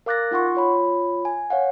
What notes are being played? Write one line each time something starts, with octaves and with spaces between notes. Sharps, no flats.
A#4 F5 D6 F#6 A6 A#6
D#4 F4 F#5 C6 C#6
F4 C#5 B5
G#5
C#5 F5 F#5